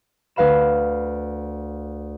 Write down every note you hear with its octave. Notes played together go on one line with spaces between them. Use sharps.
D2 B4 F5 B5 E7